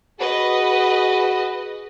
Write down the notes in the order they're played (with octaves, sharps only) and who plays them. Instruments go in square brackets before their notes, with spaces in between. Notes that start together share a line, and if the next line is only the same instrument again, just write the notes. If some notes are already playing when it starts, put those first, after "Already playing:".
[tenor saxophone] F#4 [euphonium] G#4 [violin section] B4 D#5